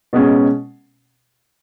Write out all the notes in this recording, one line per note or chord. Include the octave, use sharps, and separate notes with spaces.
B2 G#3 C#4